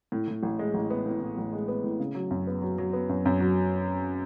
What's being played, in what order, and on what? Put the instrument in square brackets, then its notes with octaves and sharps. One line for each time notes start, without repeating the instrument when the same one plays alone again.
[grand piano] A2
A2
A1
G#3
A1
B3
A2
A2
A1
G#3
B3
A2
C#3
F#3
F#2
B3
F#3
F#3
B3
F#2
F#2
F#3